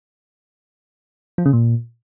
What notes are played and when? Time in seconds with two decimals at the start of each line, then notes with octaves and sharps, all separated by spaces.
1.38 F3
1.46 C#3
1.53 A#2